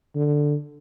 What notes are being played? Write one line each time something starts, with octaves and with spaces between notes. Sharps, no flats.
D3